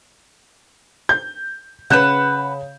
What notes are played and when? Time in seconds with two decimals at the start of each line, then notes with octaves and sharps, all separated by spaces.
1.09 G6
1.90 C#3 B4 F#5 G6 E7